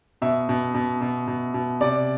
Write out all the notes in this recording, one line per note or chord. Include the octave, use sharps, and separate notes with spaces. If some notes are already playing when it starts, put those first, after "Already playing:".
B2 E5
B2
B2
B2
B2
B2
C3 D5